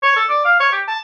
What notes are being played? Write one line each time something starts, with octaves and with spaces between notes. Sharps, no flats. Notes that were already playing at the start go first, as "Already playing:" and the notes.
C#5
A4
D5
F5
C#5
G4
A5